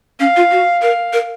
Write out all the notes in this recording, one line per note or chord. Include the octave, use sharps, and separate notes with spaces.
C#4 F5
F4
F#4
A#4 F5
A#4